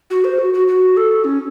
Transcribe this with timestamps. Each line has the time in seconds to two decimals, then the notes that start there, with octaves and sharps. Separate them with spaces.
0.10 F#4
0.24 C5
0.39 F#4
0.54 F#4
0.68 F#4
0.97 A4
1.24 C#4